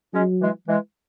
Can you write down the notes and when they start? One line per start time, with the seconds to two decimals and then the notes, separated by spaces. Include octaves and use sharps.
0.13 F#3 G#3 C#4
0.41 E3 G#3
0.68 E3 G#3